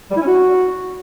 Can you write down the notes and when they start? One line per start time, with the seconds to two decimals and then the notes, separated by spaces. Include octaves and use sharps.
0.11 G3
0.16 E4
0.21 C#4
0.27 F#4